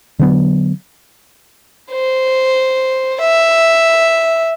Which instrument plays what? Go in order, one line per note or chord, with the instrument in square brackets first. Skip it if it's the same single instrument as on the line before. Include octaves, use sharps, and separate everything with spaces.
[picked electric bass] D3 F#3 B3
[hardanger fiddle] C5
E5